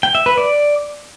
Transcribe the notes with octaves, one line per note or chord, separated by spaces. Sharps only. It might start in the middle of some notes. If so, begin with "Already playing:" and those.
G5
E5
B4
D5